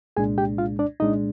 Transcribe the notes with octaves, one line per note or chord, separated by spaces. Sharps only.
C2 A#2 G#3 D4 G#4 G#5
G4 G5
F4 F5
D4 D5
C2 A#2 G#3 D4 D#4 D#5